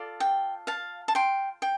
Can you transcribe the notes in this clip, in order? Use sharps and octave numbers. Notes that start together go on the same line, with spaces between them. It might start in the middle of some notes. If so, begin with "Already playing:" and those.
Already playing: F4 A4 D5
G5
F5 A5
A5
G5 C6
G5